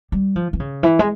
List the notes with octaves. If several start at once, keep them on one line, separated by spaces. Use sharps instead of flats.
G3
F3
E3
C#3
E3
G#3